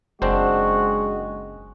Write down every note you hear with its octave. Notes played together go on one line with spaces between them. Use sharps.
F#1 G#3 C4 D4 F#4 C5